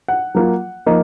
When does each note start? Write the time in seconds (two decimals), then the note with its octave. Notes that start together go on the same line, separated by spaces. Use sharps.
0.08 F#5
0.35 F#3 A#3 F4
0.86 F3 A#3 D#4